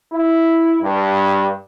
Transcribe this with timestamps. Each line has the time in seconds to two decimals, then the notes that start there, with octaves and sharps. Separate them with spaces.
0.12 E4
0.82 G2